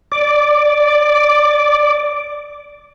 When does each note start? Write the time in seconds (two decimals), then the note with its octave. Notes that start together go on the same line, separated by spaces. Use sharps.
0.12 D5 D6